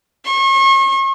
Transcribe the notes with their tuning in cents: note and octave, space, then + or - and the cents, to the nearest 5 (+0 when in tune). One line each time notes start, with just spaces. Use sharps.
C#6 -40